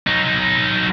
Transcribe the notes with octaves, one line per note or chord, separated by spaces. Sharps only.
F#3 D#4